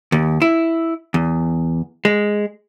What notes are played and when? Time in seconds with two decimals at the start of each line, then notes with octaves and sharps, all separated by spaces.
0.12 D#2
0.42 E4
1.14 E2
2.05 G#3